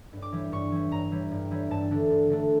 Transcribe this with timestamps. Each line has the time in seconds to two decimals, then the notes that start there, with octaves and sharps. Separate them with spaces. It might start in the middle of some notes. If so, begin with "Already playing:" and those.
0.13 G2
0.22 D6
0.32 E3 G3
0.52 G2 C#6
0.72 E3 G3
0.91 G2 A#5
1.12 E3 G3
1.31 G2
1.51 E3 G3
1.71 G2 A5
1.91 D3 A3 D4
2.10 G2
2.30 D3 A3 D4